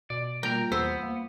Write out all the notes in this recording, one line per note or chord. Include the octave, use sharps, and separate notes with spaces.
B2 D5
G3 A#3 F4 A#4 G5 A#5
E2 B3 C5 E6
A#3